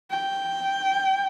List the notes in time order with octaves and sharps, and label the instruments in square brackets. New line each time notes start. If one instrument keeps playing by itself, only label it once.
[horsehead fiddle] G5